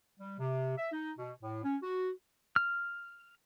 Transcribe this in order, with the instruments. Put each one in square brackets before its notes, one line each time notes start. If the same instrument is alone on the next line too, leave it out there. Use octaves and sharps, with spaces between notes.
[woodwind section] G3
C3
E5
D#4
B2
A2
C#4
F#4
[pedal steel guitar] F6